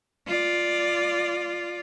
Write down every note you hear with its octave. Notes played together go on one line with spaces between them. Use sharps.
F4 D5